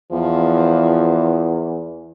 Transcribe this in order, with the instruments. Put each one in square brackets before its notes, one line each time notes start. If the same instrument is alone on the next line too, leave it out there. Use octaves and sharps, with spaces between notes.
[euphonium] E2 [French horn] F3